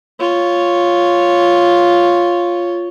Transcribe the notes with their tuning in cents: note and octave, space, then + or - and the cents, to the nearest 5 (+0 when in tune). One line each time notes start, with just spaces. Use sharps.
F4 +0 C#5 +0